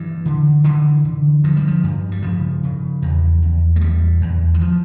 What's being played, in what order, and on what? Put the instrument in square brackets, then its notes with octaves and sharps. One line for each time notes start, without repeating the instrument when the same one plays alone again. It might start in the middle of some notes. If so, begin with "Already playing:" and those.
Already playing: [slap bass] G2 E3
D3
D3 E3
D3
G2 F3
G3
F3
G2
G3
C#3 F3
C#3
E2
E2
A3
E2 G3
E2
E3
F3